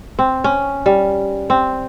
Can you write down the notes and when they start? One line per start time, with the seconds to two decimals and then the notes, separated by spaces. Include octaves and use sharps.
0.19 C4
0.44 C#4
0.86 G3
1.50 C4